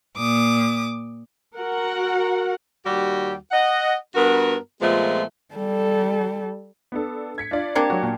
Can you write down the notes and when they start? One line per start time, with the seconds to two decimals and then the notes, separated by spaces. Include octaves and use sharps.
0.17 A#2 D6 D#6
1.57 F#4 A#4 F#5
2.85 D#2 G3 F#4 G4
3.52 D#5 F#5
4.15 G2 B3 F#4 A#4
4.82 A#2 F3 G#3 A3 B3
5.54 G3 A4
6.92 B3 D4 A4
7.38 G#6 B6 C#7
7.51 D4 F4 D5
7.75 A#3 C4 D4 G4 G#6 C#7
7.90 F#3 F#4
8.03 A#2